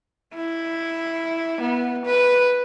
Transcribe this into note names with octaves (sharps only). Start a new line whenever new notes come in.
E4
B3
B4